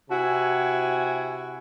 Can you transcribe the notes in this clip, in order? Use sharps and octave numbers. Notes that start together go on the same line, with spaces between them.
C3 E4 F#4 G#5